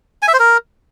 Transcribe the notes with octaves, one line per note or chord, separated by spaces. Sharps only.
G#5
E5
C5
A#4